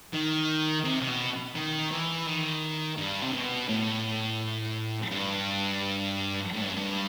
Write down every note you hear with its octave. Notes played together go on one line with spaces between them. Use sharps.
D#3
C3
C3
B2
D#3
E3
D#3
G2
C3
B2
A2
G2
A2
G2
F#2
G2